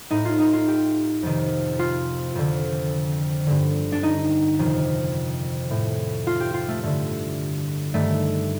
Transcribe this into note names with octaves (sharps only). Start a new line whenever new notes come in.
A2 D#4
F4
D#4
F4
G4
F2 C3 D#3
F4
F2 D3
G2 D3
D4
D#4
F2 C3 D#3
A2
F4
G4
F4
A3
G2 D3 A3
G2 D#3 A3